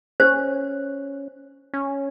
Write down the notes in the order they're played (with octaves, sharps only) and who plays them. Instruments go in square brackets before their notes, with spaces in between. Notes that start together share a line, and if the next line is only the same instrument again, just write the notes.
[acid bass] C#4 [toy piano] C5
[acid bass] C#4